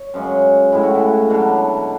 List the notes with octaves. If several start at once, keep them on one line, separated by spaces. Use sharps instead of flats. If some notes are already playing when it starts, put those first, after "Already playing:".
Already playing: C#5
F#2 C#3 G#3
A2 G#3 E4
F#4
E4
B2 F#3 D4